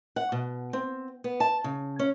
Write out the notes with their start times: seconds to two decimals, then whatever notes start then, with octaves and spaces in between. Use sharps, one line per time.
0.16 F#5
0.32 B2
0.73 C4
1.24 B3
1.40 A5
1.64 C#3
1.99 C#4